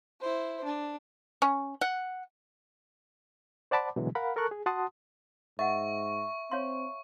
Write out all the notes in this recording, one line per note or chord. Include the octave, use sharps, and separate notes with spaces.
E4 C5
D4
C#4
F#5
C5 D5 F#5 A5 B5 D6
B2 D3 E3 F#3 G#3
A#4 F5 F#5 B5
A4 A#4 A5 C#6 F#6
G#4
F#4 F#5 A5 C6 D#6
G#2 D#5 E5 F#5 C#6
C4 C#5 F5 C6